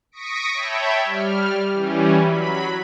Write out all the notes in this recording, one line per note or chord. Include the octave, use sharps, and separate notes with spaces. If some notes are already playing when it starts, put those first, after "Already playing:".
C#6 D#6 A#6 B6 C#7 D7
C#5 E5 G5 A5 B5
G3 F6
E3 G3 C#4
F#3 B5